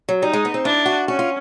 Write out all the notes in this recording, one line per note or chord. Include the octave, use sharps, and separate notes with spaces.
F#3
G3 D#4
G#3
B3
C4
D4 E4
F#4
C#4 F#4
F4